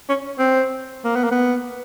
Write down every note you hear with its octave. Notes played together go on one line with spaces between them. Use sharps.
C#4
C4
A#3
B3
A#3
B3